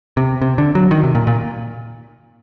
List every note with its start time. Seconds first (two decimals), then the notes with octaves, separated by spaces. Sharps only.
0.17 C3
0.42 C3
0.58 D3
0.75 F#3
0.91 D#3
1.03 C3
1.15 A#2
1.27 A#2